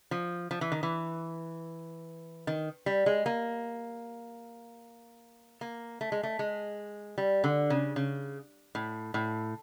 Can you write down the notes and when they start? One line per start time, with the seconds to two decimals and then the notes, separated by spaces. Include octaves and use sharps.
0.11 F3
0.51 F3
0.61 E3
0.72 D#3
0.83 E3
2.47 D#3
2.86 G3
3.06 G#3
3.26 A#3
5.61 A#3
6.01 A3
6.12 G#3
6.23 A3
6.39 G#3
7.18 G3
7.44 D3
7.70 C#3
7.96 C#3
8.75 A2
9.14 A2